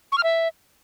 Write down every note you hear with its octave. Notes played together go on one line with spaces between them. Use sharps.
C#6
F6
E5